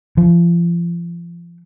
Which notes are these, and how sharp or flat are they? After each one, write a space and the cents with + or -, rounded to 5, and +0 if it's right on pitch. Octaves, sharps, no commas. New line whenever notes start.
F3 -35